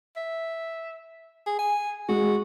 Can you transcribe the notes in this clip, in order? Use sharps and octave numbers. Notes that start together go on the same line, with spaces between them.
E5
G#4
G#5
G#3 F#4